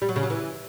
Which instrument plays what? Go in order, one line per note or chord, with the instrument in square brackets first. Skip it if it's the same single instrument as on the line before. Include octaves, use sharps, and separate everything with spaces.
[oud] G3
F#3
C#3
F#3
E3